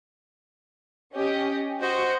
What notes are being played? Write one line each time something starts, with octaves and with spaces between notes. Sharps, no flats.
C#4 G4 D#5
F#4 C5 D#5